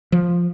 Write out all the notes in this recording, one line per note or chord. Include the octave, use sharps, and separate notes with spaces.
F3